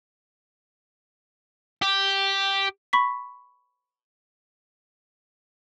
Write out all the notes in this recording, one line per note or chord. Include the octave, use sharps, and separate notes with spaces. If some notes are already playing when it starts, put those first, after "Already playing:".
G4
B5 C#6 B6